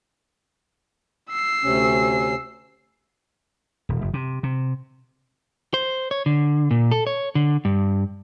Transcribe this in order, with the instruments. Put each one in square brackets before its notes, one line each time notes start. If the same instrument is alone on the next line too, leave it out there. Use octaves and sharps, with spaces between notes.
[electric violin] E6 C7
[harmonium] D2 C3 C#4
[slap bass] D#1
F#1
C3
C3
[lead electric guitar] C5
C#5
D3
A#2
A4
C#5
D3
G2